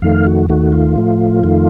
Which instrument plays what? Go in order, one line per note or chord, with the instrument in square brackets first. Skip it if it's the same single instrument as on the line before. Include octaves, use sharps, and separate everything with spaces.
[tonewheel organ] F2 D#3 A3 F5
F#4
D#2 D#3 A3 F#4
F4
A2 F3 A3
F2 D#3 A3